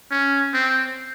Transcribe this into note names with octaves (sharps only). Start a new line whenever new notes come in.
C#4
C4